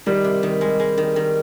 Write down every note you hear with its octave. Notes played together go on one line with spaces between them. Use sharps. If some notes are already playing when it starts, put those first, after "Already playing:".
D#3 G3
C3
D#3
G#3
G#3
D#3
D#3